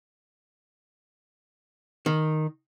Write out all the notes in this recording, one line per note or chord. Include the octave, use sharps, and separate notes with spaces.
D#3